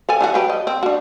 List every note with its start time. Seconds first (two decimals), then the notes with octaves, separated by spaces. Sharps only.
0.09 A4 D5 G#5
0.21 E3 D#4 F#4
0.34 F#3 G4 B4
0.50 D#5
0.67 C4
0.83 D4 F#4